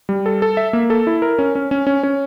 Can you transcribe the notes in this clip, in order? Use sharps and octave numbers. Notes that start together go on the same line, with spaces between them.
G3
A4
A4
E5
A#3
A4
E4
A#4
C#4
C#4
C#4
C#4
C#4